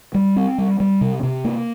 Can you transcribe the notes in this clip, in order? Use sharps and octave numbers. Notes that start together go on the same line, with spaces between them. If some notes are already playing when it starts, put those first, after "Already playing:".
G3
C4
G3
G3
C3
C3
A#3